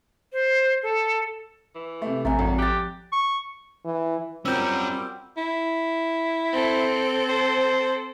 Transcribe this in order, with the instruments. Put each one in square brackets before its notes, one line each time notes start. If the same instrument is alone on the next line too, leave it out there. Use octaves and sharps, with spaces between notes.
[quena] C5
A4
[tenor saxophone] E3
[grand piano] C3 A3
[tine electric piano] A1 C4 [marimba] F3 G#5 A#5 [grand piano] A3
[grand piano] G#1 [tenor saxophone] A2
[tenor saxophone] G4 [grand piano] F#6 A6
[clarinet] C#6
[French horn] E3
[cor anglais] G3 [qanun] C4 F4 F#4 [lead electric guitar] C#4 A#4 [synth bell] E6 G6
[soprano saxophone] E4
[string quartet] C4 A4
[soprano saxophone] C5